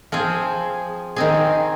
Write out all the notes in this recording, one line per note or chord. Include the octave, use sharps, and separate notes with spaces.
F3 C4 G#4
D#3 C4 G#4